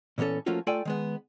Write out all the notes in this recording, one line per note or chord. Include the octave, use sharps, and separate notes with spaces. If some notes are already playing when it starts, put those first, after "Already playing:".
A#2 E3 B3 C#4 A4
F3 A3 A#3 C#4 F4 F#4
A3 F4 A4 D5 G5 G#5
D#3 G#3 B3